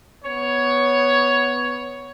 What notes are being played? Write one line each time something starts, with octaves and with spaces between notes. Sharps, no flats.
B3 C#5